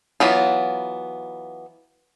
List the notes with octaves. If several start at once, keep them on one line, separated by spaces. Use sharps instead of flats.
E3 F#3 B3 F4